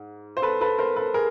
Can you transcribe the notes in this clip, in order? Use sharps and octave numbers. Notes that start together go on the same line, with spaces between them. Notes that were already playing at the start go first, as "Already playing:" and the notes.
Already playing: G#2
C5
A4 B4
A4 B4
A#4 C5
A4 B4
G#4 A#4